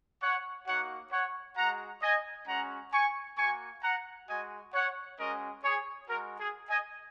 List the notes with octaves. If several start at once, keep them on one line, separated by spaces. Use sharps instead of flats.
C#5 F#5
A#3 D#4 F#4 C#5 F#5
C#5 F#5
G#3 F#4 F#5 A#5
D#5 G#5
G#3 C#4 F#4 F#5 A#5
G#5 C#6
A#3 F#4 G#5 C#6
F#5 A#5
G#3 F#4 D#5 G#5
C#5 F#5
G#3 C#4 F#4 A#4 D#5
G#4 C#5
G#3 F#4 A#4
G#4
D#5 G#5